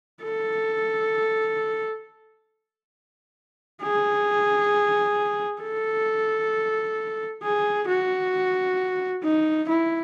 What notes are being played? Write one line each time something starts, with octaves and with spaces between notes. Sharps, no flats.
A4
G#4
A4
G#4
F#4
D#4
E4